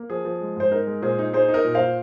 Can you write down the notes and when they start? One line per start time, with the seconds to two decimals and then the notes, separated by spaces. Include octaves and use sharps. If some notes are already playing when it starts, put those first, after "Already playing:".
Already playing: A#3
0.10 F3 G#4
0.25 F3
0.41 G#3
0.56 G#2 C5
0.71 D#4 A#4
0.87 G#3
1.02 A#2 G#4 C5
1.19 D#4
1.33 D#4 G#4 C5
1.48 D#4
1.54 A#4 D#5
1.65 A#2
1.74 C5 F5
1.80 A#2